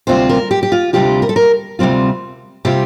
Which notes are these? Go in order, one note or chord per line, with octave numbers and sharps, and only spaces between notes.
D2 C3 G3 C4 F4 C5
A#4
G4
G4
F4
D2 C3 G3 C4 F4 G4
A#4
A4
A#4
D2 C3 G3 C4 F4
C3 G3 C4 F4 G4